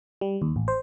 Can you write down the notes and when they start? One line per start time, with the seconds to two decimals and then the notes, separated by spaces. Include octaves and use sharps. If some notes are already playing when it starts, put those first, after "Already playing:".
0.21 G3
0.42 D#2
0.56 A1
0.68 C5